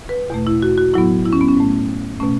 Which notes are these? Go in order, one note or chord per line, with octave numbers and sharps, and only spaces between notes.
B4
E2 B2 A3
E4
F#4
F#4
A2 F#3 B3 E4
E4
C#4
B3
C#4
A2 A3
B2 A3 C#4